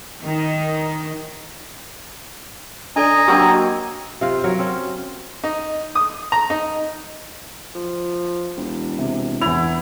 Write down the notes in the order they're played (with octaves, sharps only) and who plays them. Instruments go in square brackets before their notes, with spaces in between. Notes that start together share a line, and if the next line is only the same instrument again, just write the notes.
[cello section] D#3 D#4
[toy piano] D4 A4 D5 [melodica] D#5 G#5 A#5
[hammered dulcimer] F#3 A#3 C4 [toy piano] D4 G4
[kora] C3 F4 F5
F#3 A#4 C#5
C4 C#4
[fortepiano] D#4
D#6
A#5
D#4
[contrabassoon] F3
E1
[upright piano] C3
[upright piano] E2 F7 [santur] E4